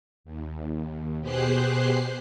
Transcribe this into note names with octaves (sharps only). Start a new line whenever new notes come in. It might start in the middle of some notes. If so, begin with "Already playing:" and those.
D#2
B2 G4 G#4 C5 F#6 C7